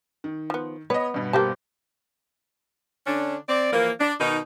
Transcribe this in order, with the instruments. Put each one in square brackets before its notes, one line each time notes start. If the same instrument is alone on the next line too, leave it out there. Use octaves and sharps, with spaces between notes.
[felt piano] D#3
[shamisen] F3 B3
[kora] B3 [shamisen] B4 [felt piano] C#5 D#5
[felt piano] G2 B2
[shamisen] A#3 F5 A5 [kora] C4 G4
[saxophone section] D3 C#4 D4
C4 D5
E3 F3 A#3
D4
B2 D#3 D#4